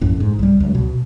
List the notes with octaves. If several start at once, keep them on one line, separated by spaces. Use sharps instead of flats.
A#1 F#2 A2
G#2
C2 G3
C#2 F#3
B2